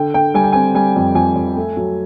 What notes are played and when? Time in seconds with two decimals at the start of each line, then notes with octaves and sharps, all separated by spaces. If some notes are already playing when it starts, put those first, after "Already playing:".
Already playing: D3 G5
0.14 D3 G5
0.34 G3 G#5
0.44 G5
0.52 C4 G#5
0.75 G3 G#5
0.96 F2
1.15 F2 G#5
1.35 F2
1.57 A3
1.77 F#3